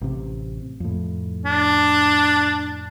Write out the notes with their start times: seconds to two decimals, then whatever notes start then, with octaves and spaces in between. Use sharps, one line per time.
0.01 A1 C3
0.80 F2 A2
1.45 D4